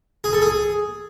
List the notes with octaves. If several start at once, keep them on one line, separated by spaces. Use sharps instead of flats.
G#4
A4
G#4